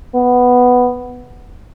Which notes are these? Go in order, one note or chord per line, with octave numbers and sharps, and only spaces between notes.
B3